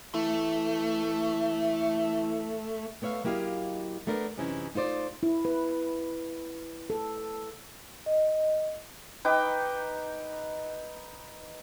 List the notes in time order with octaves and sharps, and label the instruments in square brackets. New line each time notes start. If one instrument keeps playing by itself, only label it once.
[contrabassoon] E3 [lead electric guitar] A3
[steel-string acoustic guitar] A3 B3 C#5 E5 F5
F#3 A#3 E4 G4 D#5 F5
A3 B3 D4 A#4
F#2 C3 E3 C#4 D#4 E4
A3 D#4 F4 C5 D5
[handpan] E4
B4
A4
[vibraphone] D#5
[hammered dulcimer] D#4 B4 G5 D6